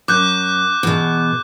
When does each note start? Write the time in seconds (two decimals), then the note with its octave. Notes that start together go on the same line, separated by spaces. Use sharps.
0.08 F#2 D6 F#6 G6
0.83 E2 B2